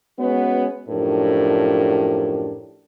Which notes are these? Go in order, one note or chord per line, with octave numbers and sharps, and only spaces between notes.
G#3 B3 C#4 F#4 B4 C#5
F#2 A2 F3 D4 G4 A#4